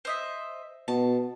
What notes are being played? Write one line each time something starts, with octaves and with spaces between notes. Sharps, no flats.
C5 D#5 E5
B2 A5